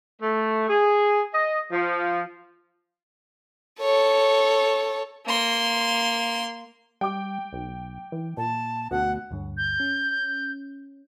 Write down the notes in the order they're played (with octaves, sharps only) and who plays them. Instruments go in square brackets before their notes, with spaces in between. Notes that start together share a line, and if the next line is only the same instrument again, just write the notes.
[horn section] A3
G#4
D#5
F3
[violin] A4 C#5
A#3 C6
[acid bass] G3 [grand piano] G5 D6
[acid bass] B1
E3
[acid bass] A#2 [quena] A5
[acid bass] D2 [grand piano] B2 [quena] F#5
[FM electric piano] D2 G2 D3
[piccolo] G6
[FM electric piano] C#4